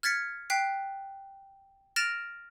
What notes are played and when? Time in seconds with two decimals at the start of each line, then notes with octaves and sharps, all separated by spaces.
0.03 F6 G#6 A6 B6 C#7
0.50 G5 F#6 B6 C7
1.96 F6 A6 A#6 D7 E7 F7